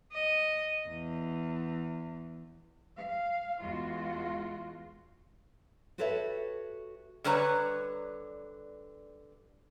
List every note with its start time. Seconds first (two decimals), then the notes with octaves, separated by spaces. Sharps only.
0.13 D#5
0.88 E2
2.96 F5
3.60 E2 G#3 F4 F#4
5.98 F#4 G4 A4 B4 C#5 E5
7.24 D3 G3 B4 C#5 A#5